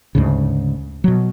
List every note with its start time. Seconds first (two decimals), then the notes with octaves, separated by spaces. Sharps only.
0.15 D2 G#2 C#3
1.04 B2 F#3